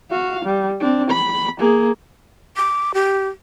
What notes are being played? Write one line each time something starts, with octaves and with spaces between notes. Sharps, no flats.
F#4 F5
G3
C4 D4
B5
A#3 G#4
D6
G4